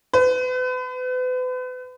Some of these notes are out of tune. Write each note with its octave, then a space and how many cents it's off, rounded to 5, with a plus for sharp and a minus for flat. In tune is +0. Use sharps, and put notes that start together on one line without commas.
B4 +40